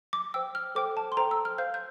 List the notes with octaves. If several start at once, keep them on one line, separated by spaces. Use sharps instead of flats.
D6
C5 G5 E6
F6
A4 C5 G5 D6
A5
C6
A4 C5 G5 A#5
E6
F6
C5 F5 G6
G6